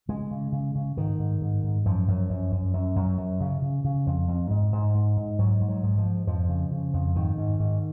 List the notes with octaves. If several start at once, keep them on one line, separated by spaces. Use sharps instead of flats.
C#3 G#3
C#3
C#3
C#3
G#2 D#3
G#2
G#2
G#2
F#2 F3
F#2
F#2
F#2
F#2
F#2
F#2
C#3
C#3
C#3
F2
F2
G#2
G#2
G#2
G#2
G#2 F#3
G#2
F#3
G#2
F3
G#2
F2 F3
C#3
C#3
F2
G#2 D#3
G#2
G#2